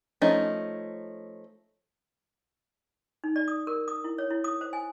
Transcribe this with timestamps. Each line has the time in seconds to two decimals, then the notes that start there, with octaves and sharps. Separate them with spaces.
0.22 F3 A3 C#4 D#4
3.24 D#4
3.36 D5
3.48 D#6
3.67 A#4
3.88 D#6
4.04 E4
4.18 C#5
4.30 E4
4.44 D#6
4.61 C5
4.73 G#5